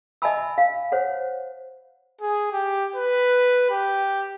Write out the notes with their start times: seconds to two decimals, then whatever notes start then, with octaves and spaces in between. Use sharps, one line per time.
0.22 D#5 E5 G#5 A5 B5 E6
0.58 F5
0.92 C5 C#5 F#5
2.21 G#4
2.52 G4
2.96 B4
3.70 G4